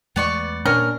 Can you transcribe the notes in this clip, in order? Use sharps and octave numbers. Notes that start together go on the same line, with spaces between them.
E2 G#3 A3 B3 D5 C#6
G2 A#2 A#3 C#4 D4 A#4